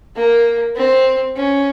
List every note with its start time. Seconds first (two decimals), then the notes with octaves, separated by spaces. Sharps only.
0.16 A#3
0.76 C4
1.36 C#4